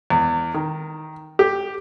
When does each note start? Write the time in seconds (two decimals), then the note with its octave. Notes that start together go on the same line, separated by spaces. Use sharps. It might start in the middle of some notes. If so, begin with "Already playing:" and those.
0.10 E2
0.54 D#3
1.39 G4